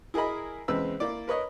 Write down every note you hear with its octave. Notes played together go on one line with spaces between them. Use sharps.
E4 G#4 A#4 D#5 B5
E2 C#3 G#3 C4 B4 E6
A#3 E4 D5
A#4 B4 C#5 D#5